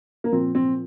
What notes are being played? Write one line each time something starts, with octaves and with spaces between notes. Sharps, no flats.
A#3
A#2 F3 C4
C4